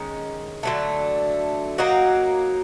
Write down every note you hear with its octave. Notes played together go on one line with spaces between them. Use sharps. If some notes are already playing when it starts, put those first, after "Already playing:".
Already playing: D#3 G#3 C#4
D3 F#3 A3
F#3 A#3 D#4 F#4